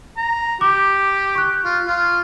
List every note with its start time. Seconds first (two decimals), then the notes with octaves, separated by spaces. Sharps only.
0.17 A#5
0.61 G4 D6
1.35 C#6 F#6
1.65 F4
1.87 F4